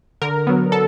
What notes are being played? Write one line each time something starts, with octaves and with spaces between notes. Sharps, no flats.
D3 A#4
F#3 B3
D3 A4